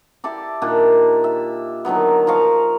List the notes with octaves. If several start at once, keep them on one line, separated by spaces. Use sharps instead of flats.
E4 G4 A4 D5
A#2 D#3 D4 G4
E5
D3 D#3 F#3 B3
F3 A#4 F5 C#6